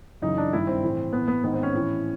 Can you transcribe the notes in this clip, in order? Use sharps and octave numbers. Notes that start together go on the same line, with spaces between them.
F#2 C#3 E3 D#4
D4
G2 D#3 E4
C4
A2 E3
A2 E3 B3
B3
G#2 D#3 B3
C4
C#4
A2 E3